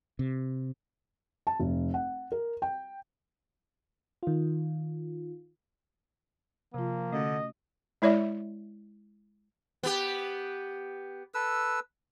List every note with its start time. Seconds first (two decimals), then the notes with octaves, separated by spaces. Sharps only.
0.19 C3
1.47 A5
1.60 F1
1.94 F#5
2.32 A#4
2.62 G5
4.23 D#3 F4
6.74 C3 F3 A#3 F4
7.13 D3 A3 C#4 F#4 D#5
8.02 G#3 E4 C#5 D5 E5
9.83 B3 G4
11.34 A4 B4 E6